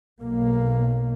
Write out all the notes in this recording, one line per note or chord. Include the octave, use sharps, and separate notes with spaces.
B1 A#3